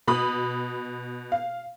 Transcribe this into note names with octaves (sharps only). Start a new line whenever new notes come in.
B2 B5 D#6
F5